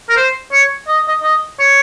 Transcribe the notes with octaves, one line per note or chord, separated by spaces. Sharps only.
A#4
C5
C#5
D#5
D#5
D#5
C#5